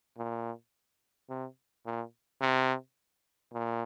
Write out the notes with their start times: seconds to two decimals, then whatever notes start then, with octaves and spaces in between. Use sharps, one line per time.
0.18 A#2
1.29 C3
1.86 A#2
2.41 C3
3.53 A#2